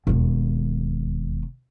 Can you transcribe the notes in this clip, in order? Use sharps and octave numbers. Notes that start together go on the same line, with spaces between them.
E1 D#2